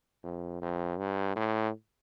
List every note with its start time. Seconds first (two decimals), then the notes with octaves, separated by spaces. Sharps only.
0.24 F2
0.62 F2
0.98 G2
1.36 A2